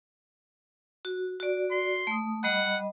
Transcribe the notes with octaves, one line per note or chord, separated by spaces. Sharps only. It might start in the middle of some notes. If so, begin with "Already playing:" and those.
F#4
F#4 D5
C6
A3 D#6
G3 D#5 F#5 B5